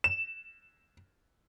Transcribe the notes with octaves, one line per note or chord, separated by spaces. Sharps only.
E7